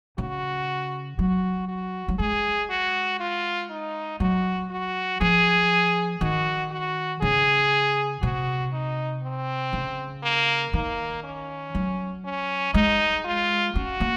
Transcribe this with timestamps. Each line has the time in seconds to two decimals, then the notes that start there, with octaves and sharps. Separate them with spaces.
0.18 C#3 F#4
1.19 F#3 F#4
1.69 F#4
2.08 F#3
2.19 G#3 G#4
2.70 F#4
3.20 F4
3.70 D#4
4.20 F#3 F#4
4.71 F#4
5.21 F3 G#4
6.21 D#3 F#4
6.71 F#4
7.21 C#3 G#4
8.22 C3 F#4
8.72 D#4
9.23 C4
9.73 C#3
10.23 A#3
10.73 D#3 A#3
11.24 C#4
11.75 F#3
12.25 C#4
12.74 G#3 D#4
13.25 F4
13.76 C#4 F#4
14.00 A#3